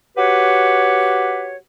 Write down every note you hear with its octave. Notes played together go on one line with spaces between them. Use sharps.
F#4 G4 B4 C#5